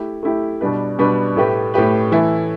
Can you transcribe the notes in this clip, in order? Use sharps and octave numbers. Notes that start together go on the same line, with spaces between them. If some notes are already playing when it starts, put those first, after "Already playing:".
Already playing: A3 E4 G4
A3 E4 G4
B2 G3 D4 B4
B2 G3 D4 B4
A2 A3 G4 B4
A2 A3 G4 B4
E3 A3 E4 A4